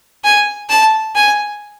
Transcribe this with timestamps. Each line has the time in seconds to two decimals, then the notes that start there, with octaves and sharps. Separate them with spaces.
0.24 G#5
0.70 A5
1.16 G#5